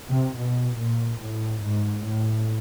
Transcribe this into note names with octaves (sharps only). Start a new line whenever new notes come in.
C3
B2
A#2
A2
G#2
A2